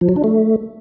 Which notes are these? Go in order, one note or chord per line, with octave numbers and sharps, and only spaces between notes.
F3
F#3
D4
A3